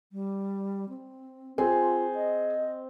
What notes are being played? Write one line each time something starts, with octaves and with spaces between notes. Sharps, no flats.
G3
C4
C4 F4 G#4
D#5